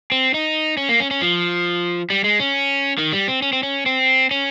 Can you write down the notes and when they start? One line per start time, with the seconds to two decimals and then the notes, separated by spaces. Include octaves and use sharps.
0.12 C4
0.34 D#4
0.77 C#4
0.89 A#3
1.00 C#4
1.11 C#4
1.22 F3
2.10 G3
2.24 G#3
2.40 C#4
2.98 D#3
3.13 G3
3.28 C4
3.42 C#4
3.53 C4
3.63 C#4
3.86 C4
4.31 C#4